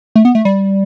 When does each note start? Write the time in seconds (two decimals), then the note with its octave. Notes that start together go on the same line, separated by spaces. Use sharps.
0.16 A3
0.25 B3
0.35 A3
0.45 G3